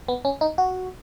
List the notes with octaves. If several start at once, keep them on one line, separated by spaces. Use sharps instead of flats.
B3
C#4
D#4
F#4